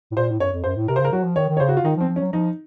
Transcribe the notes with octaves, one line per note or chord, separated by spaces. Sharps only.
A2
A#2 C5
A2
F#2 C#5
F2
F#2 C5
A2
C3 A#4
C5
C#3
A#4
F#3 F#4
F3
D#3 C#5
D#3
C#5
C#3 C5
F#4
F4
D#3 D#4
F3
C4
F3
C#4
F#3
F3 D#4